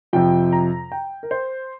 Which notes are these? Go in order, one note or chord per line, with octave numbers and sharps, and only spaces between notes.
F2 C3 F3 G5
A#5
G5
A#4
C5